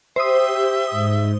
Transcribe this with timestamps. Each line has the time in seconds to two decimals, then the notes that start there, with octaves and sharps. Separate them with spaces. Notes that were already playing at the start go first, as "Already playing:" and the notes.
0.16 G4 C5 E5 D#6
0.91 G#2